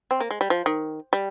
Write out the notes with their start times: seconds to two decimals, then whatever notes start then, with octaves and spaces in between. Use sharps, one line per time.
0.11 C4
0.20 A#3
0.31 G#3
0.41 G3
0.50 F3
0.66 D#3
1.13 G3